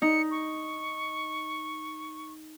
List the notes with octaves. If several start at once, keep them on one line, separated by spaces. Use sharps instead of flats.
D#4 C#7
C#6